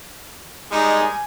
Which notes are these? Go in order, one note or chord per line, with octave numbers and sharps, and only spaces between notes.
G3 G#3 D#4 G#5